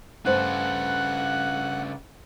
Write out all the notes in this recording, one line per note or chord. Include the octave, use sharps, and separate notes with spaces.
G2 C#3 A3 B4 C5 F#5 F#6